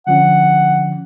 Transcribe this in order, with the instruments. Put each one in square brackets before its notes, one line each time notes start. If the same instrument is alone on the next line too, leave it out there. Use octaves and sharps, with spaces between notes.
[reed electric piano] D3 F3 C#4 [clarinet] F#5